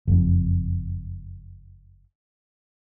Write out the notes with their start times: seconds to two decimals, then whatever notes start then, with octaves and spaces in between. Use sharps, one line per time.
0.07 F#1 F2